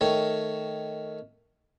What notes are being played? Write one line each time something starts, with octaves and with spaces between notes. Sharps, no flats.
D#3 A3 C#5